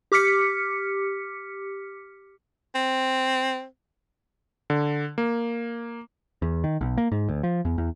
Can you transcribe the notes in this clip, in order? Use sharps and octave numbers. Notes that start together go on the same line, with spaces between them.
G4 D6 F6 B6 C#7
C4
D3
A#3
E2
D#3
B1
A#3
G#2
D2
F3
E2
E2